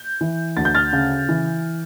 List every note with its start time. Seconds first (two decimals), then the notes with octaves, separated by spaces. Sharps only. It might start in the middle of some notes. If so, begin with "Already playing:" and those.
Already playing: G6
0.21 E3
0.57 D2 A6
0.65 G6
0.75 F6 A6
0.93 C#3
1.28 E3